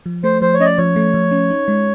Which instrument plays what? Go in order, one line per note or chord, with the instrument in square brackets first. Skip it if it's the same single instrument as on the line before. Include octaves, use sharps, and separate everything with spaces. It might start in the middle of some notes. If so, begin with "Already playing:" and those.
[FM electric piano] F3
[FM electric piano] A3 [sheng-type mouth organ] C5
[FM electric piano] F3 [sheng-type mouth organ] C5
[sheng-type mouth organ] C#5
[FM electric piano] C#4 [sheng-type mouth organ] D#5
[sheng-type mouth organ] D5
[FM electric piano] F3 [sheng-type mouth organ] C#5
[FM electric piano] A3
F3
C#4
D#4
G#3